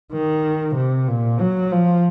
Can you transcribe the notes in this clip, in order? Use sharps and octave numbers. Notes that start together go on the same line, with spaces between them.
D#3
C3
A#2
F#3
F3